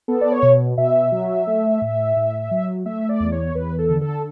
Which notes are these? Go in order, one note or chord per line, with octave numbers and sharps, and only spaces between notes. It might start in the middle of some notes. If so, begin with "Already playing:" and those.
B3 A4
D5
C#5
B2
B2 E5
F#3
A3
A2
A2
F#3
A3 E5
D5
E2
C#5
E2 B4
A4
D3
A4